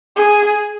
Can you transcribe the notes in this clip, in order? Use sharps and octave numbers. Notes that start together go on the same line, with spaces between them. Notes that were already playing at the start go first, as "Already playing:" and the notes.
G#4